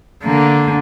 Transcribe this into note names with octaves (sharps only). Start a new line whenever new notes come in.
D3 A#3